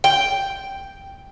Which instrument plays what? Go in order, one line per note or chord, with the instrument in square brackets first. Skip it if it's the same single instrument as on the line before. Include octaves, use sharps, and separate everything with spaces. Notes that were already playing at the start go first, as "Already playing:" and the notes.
[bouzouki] G5